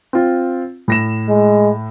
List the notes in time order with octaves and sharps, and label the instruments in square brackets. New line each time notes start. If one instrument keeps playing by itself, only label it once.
[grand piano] C4 F4
A2 A#6 E7
[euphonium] G#3